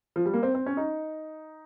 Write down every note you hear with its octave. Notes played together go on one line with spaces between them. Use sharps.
F3
G3
A#3
C4
C4
C#4
D#4